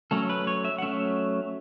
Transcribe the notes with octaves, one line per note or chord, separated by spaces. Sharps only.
F#3 A3 C#4 A4
B4
C#5
E5
F#5
F#3 A3 C#4 E5